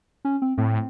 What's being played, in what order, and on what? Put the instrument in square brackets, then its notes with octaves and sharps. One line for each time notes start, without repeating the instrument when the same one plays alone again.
[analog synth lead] C#4
C4
[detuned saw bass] A2 [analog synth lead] C4